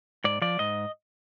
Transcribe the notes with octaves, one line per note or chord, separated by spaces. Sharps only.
G#2 D5
F3 D5
G#2 D#5